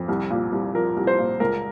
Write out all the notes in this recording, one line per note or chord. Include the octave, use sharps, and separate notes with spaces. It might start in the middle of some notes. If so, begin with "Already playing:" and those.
Already playing: F2
C2
A#2
C2
F3 A#4
C2
C5
A#2
C#2 A#4